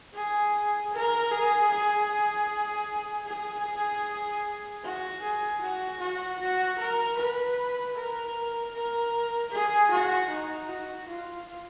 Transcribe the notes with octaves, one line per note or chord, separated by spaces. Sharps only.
G#4
A#4
G#4
G#4
G#4
F#4
G#4
F#4
F#4
F#4
A#4
B4
A#4
A#4
G#4
F#4
D#4
F#4
F4